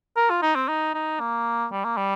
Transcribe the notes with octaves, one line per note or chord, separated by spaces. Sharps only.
A#4
F4
D#4
C4
D#4
D#4
A#3
G3
A#3
G3